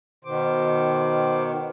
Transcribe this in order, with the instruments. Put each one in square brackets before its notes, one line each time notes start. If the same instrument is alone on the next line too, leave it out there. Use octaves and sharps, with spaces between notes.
[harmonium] B2 D#3 [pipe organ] C5 D6